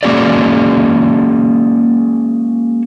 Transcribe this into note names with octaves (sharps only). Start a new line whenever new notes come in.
G#3 A#3 C#4 F#4 G#4 D5